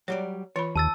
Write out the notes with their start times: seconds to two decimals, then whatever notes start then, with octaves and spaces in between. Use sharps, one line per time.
0.08 F#3 G3 C#5 D5
0.56 E3 F4 C#5 B5
0.76 D#2 A5 E6 A6